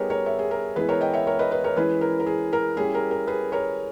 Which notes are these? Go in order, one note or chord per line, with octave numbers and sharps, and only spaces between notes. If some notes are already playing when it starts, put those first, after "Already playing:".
Already playing: G3 B3 D#4 G#4 A#4 B4 C#5
A#4 C#5
C#5 E5
G#4
A#4
E3 G#3 B3 E4 G#4 B4
A#4 C#5
D#5 G5
C#5 E5
A#4 C#5
B4 D#5
B4 D#5
A#4 C#5
E3 G#3 C#4 E4 G#4 B4
A#4
A#4
G#4
A#4
G3 C#4 E4 G#4
A#4
A#4
G#4 B4
A#4 C#5